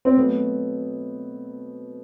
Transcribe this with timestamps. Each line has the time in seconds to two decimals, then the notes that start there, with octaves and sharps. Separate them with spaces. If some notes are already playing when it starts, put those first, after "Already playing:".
0.05 C4
0.16 B2 F#3 A3 B3